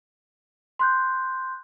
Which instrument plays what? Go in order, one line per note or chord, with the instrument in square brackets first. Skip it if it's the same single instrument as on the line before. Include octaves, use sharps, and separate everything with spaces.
[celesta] C6 F#6 G6